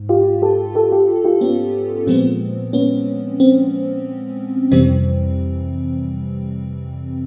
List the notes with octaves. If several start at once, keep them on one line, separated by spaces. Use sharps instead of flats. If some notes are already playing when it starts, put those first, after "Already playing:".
Already playing: G#2
F4 G4
G4 A4
G4 A4
F4 G4
F4 G4
B3 C#4
A#2 F3 G#3 B3 C4
B3 C#4
C4
F2 C3 E3 G3 C4